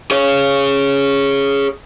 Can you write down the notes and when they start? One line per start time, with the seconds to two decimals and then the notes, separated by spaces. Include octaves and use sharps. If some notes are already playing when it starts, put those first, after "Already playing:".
0.11 G#4 C#5